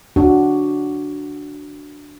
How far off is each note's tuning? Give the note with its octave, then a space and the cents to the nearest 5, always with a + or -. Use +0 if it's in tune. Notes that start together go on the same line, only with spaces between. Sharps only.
D4 +0 F#4 +0